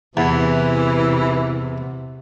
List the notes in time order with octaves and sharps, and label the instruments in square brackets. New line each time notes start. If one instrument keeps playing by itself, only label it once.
[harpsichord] E2 [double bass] C3 [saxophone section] E3